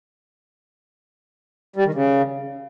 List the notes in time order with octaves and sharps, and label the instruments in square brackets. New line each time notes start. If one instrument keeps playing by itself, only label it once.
[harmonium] G3
D#3
C#3